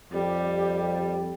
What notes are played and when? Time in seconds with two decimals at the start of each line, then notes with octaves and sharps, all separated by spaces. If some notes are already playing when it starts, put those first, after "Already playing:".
0.12 F2 G3 G4